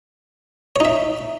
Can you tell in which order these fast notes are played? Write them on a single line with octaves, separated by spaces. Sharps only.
C#5 D#4 E5